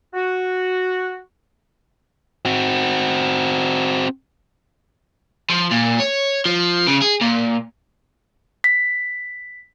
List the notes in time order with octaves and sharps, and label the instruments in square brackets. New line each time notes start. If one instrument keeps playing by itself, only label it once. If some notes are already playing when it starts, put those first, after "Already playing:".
[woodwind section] F#4
[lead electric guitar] C4 F#4
[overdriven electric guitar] F3
A#2
C#5
F3
C#3
G#4
A#2
[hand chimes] B6